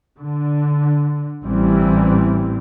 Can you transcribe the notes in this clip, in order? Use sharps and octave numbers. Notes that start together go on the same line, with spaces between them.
D3
A1 E3 G3 C4